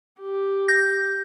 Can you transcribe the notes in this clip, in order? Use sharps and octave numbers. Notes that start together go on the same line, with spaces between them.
G4
G6 A#6